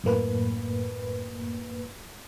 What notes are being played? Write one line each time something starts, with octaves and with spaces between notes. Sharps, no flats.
F#2 A2 A#3 B4